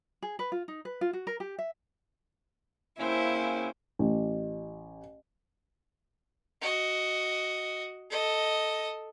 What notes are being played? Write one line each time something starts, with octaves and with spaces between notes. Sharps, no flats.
G#4
B4
F4
D#4
B4
F4
F#4
A#4
G4
E5
C#3 A#3 C4 C#4 E4 C5
A1
F#4 D#5
A4 D#5